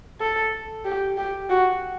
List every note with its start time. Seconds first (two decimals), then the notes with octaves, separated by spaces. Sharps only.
0.20 A4
0.85 G4
1.18 G4
1.49 F#4